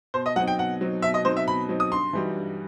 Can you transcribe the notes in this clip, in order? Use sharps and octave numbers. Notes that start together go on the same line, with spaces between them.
B2 C5
D#5
F#3 C4 D#4 F#5
G5
B2 F#5
F#3 C4 D#4
B2 E5
D#5
F#3 C4 D#4 C5
E5
B2 B5
F#3 C4 D#4
D#6
G2 C6
E3 G3 D#4 F#4
G2